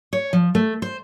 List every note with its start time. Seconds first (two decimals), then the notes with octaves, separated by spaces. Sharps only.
0.13 C#5
0.33 F3
0.55 A3
0.82 C5